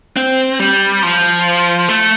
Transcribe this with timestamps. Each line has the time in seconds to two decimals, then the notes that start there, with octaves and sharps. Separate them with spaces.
0.16 C4
0.59 G3
1.03 F3
1.89 A3